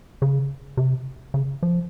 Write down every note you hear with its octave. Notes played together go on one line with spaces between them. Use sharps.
C#3
C3
C#3
F3